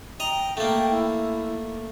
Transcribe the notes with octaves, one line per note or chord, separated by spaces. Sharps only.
D#5 G5 A#5
A3 A#3 G5
E4